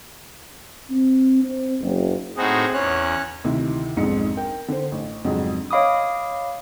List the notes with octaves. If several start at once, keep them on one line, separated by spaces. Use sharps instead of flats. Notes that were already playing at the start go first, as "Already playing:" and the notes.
C4
C4
F#1
A2 C4 D#4 F#4 G#4
E2 C#4 C#5 F#6
D2 C3 D#3 E4
B1 F2 G#2 C4 D4 C#7
A#4 G5
D3 C5
A1
F2 G#2 C#3 F#3 C4 D4
C#5 D#5 F5 B5 D6 D#6